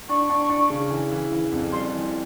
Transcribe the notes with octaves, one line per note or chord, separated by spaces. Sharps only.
D4 C#6
D4
D4
C#3
E3
E3
E3
F2
G3 C6
E3